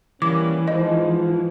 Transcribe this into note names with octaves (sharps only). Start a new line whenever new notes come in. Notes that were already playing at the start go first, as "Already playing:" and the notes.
E3 G3 A#3 C#4 D6
G#2 F3 D#5